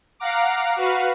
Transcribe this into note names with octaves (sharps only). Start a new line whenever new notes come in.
F5 F#5 A#5 D6
F#4 B4 F5